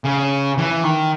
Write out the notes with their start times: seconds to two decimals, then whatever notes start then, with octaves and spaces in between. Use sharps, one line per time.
0.05 C#3
0.58 E3
0.84 D#3